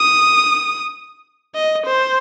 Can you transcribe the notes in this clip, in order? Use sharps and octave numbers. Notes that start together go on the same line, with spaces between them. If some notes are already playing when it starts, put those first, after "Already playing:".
Already playing: D#6
D#5
C5